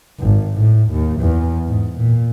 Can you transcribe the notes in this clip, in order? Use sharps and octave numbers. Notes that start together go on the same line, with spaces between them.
G#1
A2
D#2
E2
G#2
A#2